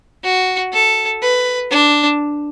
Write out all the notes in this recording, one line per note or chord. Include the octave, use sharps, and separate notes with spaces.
F#4
A4
B4
D4